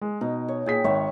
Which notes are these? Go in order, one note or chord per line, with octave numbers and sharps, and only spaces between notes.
G#3
B2 D#4
C#5
A#2 G#4 G5 B6
G#1 C#5 E5 F#5